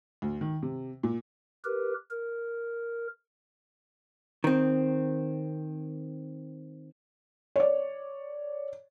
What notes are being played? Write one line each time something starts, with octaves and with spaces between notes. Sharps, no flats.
D2
D#3
C3
A#2
G4 A#4 B4
A#4
D#3 C4
C#5 D5